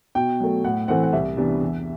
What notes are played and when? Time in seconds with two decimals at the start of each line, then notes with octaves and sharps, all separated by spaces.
0.15 B2 G5
0.40 F#3 A3
0.64 A2 F#5
0.88 E3 A3 C4 F#5
1.03 F#5
1.13 C2 E5
1.37 C3 E3 B3 D4
1.62 E2